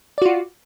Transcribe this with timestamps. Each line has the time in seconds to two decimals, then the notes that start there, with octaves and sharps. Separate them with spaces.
0.18 D5
0.22 F#4
0.26 F4